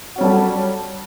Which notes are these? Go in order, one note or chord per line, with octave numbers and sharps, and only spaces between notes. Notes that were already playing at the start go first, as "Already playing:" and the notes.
F#3 G3 C#4 F#4 A4